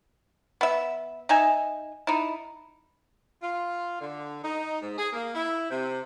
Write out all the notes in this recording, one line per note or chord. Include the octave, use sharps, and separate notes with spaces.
B3 E5
D#4 E5 G#5
D#4 E4
F4
D3
D#4
G#2
G#4
A#3
E4
C3